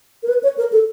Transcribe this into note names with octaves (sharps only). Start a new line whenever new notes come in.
A#4
B4
C#5
A#4
A4